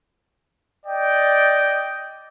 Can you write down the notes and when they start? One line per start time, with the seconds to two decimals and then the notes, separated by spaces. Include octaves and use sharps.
0.85 D5 D#5 G5